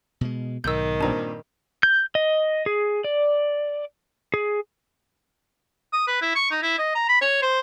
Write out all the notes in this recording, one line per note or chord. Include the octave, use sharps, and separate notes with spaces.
B2 G#3
B1 G#2 D#3 E6 G6
G2 A#2 C4 D4 A#5
G6
D#5
G#4
D5
G#4
D#6
B4
E4
C#6
D#4
E4
D#5
A#5
B5
C#5
C5